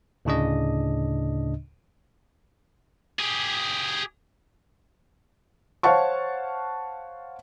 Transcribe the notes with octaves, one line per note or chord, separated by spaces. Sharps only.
D2 A2 C#3 D4 D#5
G4 G#4
C5 C#5 F5 F#5 A5 C#6